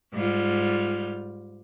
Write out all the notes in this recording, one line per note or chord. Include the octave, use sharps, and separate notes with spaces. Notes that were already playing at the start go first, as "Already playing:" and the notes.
G#2 G3 F4